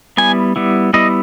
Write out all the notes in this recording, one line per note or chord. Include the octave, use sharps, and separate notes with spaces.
G3 B3 E4 G#5
G3 B3 E4
G3 B3 E4 D#5